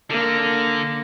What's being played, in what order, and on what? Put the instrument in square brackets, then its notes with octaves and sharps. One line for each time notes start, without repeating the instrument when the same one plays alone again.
[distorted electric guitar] D3 [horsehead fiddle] A#3